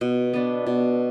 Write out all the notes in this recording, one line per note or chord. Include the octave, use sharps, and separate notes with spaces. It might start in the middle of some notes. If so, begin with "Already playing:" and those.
B2
B3 D4
B2